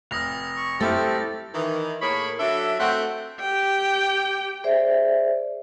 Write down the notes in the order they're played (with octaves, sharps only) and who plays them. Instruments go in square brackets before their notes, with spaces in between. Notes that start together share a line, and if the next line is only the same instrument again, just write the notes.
[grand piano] F1 F6 [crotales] D#6 A#6 F7
[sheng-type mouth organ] C#6
[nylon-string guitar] A3 [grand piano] C4 E4 F6 [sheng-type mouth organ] G4 A4 [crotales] A6
[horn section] D#3 E3
A2 A#3 G#4 C#5 B5
F#3 D4 A4 E5
A3 C4 E5 F#5 G5
[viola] G4 G5
[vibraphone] G#4 C5 D5 E5